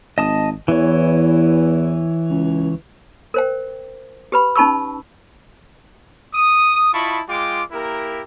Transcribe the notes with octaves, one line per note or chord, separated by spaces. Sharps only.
G#1 D#5 A5 D#6
E2 E3 C#5
C#2
A#4 C5 G5
G4 B4 B5
C#4 D#4 A5 B5 C#6 E6
D#6
E4 F4 D#5 A5 B5 C#6
G#3 F4 G5 D6
A#3 E4 G4 A#4